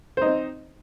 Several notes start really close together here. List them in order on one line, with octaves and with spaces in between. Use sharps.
C5 D#4 C4